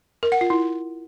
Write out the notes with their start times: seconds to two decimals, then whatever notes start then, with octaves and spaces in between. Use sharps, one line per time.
0.23 A#4
0.32 F#5
0.41 F4
0.50 E4